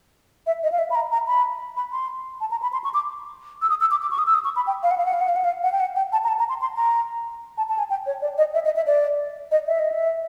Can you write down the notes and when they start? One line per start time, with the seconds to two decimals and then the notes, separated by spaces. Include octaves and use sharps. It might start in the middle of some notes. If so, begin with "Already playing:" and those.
0.47 E5
0.63 D#5
0.72 F5
0.79 E5
0.90 B5
0.95 A#5
1.12 A#5
1.27 B5
1.77 B5
1.92 C6
2.41 A5
2.51 A#5
2.62 B5
2.73 C6
2.84 C#6
2.94 D6
3.62 E6
3.70 D#6
3.81 E6
3.91 D6
4.02 D6
4.11 C#6
4.18 D#6
4.27 E6
4.34 D#6
4.45 C#6
4.56 B5
4.67 G5
4.83 F5
4.91 F#5
4.98 F5
5.05 F#5
5.13 F5
5.21 F#5
5.29 F5
5.36 F#5
5.44 F5
5.63 F#5
5.72 G5
5.80 F#5
5.96 G5
6.13 A5
6.24 A#5
6.28 A5
6.39 A#5
6.49 C6
6.61 C6
6.76 A#5
7.58 A5
7.69 A5
7.78 G#5
7.90 G5
8.06 C#5
8.22 D5
8.38 D#5
8.54 E5
8.65 D#5
8.76 E5
8.86 D5
9.51 D#5
9.67 E5
9.79 D#5
9.92 E5